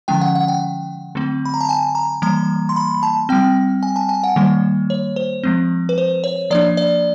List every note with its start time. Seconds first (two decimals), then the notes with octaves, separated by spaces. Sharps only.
0.08 D3 F3 G#3 C#4 G5
0.21 F#5
0.35 F#5
0.48 G5
1.15 D3 F#3 A3 C4
1.45 B5
1.54 A#5
1.61 A5
1.69 G#5
1.95 A#5
2.22 E3 G3 A#3 A#5
2.69 C6
2.76 B5
3.03 A5
3.29 G3 C4 G5
3.83 G#5
3.96 A5
4.09 G#5
4.24 F#5
4.36 D#3 G3 A#3
4.90 C#5
5.16 C5
5.43 F3 G#3 C4
5.89 B4
5.98 C5
6.24 C#5
6.50 F3 A#3 D4 D5
6.77 D5